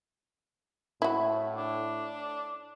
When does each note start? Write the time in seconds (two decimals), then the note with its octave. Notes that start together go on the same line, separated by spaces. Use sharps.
1.02 A2 E4 F#4
1.57 D4